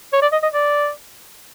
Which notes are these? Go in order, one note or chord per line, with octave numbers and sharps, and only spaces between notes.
C#5
D5
D#5
D#5
D5